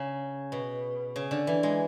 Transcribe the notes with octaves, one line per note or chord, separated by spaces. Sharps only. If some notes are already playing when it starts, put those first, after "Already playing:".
Already playing: C#3
B2
C#3
D3
E3
G#3